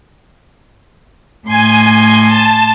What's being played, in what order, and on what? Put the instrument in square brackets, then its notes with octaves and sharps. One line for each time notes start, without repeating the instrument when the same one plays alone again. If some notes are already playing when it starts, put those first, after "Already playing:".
[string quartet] A2 C6 [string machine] G#5
[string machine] A5